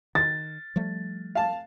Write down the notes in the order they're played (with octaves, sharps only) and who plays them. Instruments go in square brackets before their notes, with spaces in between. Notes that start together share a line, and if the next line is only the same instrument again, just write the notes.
[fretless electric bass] D#3 [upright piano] A6
[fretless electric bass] F3 G3 A3
[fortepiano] F5 A5